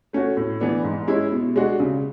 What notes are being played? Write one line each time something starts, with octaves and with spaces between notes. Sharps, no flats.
A3 C#4 F#4
A2
E3 B3 D4
G#2
G#3 C#4 E4
B2
G#3 D4 F#4
C#3